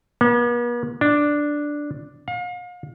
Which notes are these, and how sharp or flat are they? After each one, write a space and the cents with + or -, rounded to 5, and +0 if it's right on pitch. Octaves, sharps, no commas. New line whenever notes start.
B3 -45
D4 +0
F5 +40